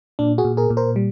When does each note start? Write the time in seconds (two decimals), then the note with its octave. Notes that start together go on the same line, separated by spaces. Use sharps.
0.19 A#2 D4
0.38 F#4 G#4
0.45 A#2
0.57 G#4 A#4
0.70 A#2
0.77 A#4 C5
0.96 G3